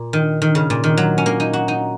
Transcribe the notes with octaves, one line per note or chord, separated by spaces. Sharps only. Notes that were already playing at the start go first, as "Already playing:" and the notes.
Already playing: A#2
D#3
D#3
C#3
A#2
D#3
F#3
C#4
A#3
D#4
F#4
D#4